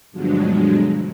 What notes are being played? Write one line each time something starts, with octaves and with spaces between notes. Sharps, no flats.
G2 B2 D3 F3 F#3 G#3